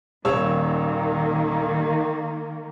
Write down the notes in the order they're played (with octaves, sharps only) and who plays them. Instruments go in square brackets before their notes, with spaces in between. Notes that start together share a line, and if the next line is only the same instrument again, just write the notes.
[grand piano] D#1 C#5 E6 [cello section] D#3 A#3